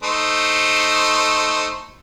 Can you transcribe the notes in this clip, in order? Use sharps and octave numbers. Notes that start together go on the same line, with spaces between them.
A3 D#4 C5